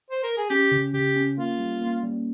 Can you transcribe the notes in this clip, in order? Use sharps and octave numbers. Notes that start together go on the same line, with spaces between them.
C5
A#4
G#4
C#4 G4
C#3
C#3 G4
C#4
A#3 F4
G3
A#3
G3